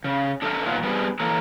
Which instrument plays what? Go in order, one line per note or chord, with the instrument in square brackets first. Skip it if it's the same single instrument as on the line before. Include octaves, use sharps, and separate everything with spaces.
[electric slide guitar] C#3
D4 A4 A#4 D5 E5
A#2 D#3 F#3 B3 F4
G3 B3 C4 D4 G#4
E3 A#3 A4 C#5 A#5